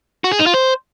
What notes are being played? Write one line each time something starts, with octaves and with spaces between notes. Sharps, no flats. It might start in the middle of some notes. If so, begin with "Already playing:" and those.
F#4
G#4
D#4
F4
C5